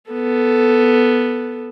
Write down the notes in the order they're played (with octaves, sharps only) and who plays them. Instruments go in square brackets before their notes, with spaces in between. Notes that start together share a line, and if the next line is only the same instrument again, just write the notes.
[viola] B3 A4